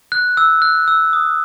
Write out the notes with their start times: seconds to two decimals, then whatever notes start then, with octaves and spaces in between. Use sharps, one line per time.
0.12 F#6
0.37 E6
0.62 F#6
0.88 E6
1.13 D#6